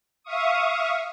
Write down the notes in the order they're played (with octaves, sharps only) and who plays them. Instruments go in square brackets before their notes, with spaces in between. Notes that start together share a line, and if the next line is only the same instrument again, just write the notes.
[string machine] E5 F5 C#6 D#6